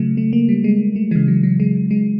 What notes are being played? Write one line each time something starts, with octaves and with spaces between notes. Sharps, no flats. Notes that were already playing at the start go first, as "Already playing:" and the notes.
Already playing: C#3 F#3 A3
A3
A#3
G3
G#3
A3
C#3 E3 G#3
F#3
F#3
G#3
G#3